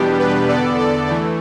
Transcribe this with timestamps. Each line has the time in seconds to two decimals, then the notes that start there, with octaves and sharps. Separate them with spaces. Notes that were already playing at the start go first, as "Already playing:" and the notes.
Already playing: E2 B2 G3 B3 D4 G4
0.19 G4 B4
0.48 E2 D3 B3 A4 D5
0.79 A4 D5
1.09 E3 A3